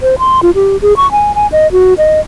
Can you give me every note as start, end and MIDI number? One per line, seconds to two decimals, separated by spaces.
0.01 0.19 72
0.19 0.40 84
0.43 0.51 65
0.55 0.77 67
0.82 0.96 68
0.97 1.10 85
1.12 1.35 80
1.35 1.47 80
1.52 1.70 75
1.72 1.94 66
1.98 2.20 75